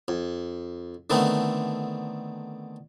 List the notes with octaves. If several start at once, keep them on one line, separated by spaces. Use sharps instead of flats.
F2
D3 D#3 A3 B3 C4